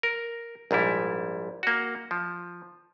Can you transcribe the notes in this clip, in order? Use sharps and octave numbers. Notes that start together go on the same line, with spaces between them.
A#4
A#1 G#2 G3 E4
A#3 F#4
F3